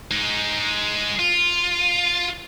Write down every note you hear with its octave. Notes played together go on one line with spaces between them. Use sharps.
G#3 D#4
F4